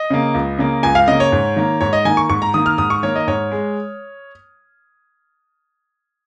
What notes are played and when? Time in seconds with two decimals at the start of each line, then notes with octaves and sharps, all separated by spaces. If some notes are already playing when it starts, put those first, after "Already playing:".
Already playing: D#5
0.10 C#3 A#3
0.34 C#2
0.58 C#3 A#3
0.83 C#2 G#5
0.95 F5
1.08 C#3 A#3 D#5
1.20 C#5
1.32 G#2
1.56 D#3 A#3
1.81 G#2 C#5
1.93 D#5
2.05 D#3 A#3 G#5
2.17 C#6
2.30 G#2 C#6
2.42 A#5
2.54 D#3 A#3 D#6
2.66 F6
2.78 G#2 D#6
2.90 C#6
3.03 D#3 A#3 C#5
3.16 D#5
3.27 G#2 C#5
3.51 G#3